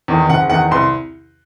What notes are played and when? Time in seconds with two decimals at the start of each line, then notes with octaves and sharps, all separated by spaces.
0.08 E2 D#3
0.29 F#1 F#5
0.50 E2 D#3 F#5
0.71 C2 C6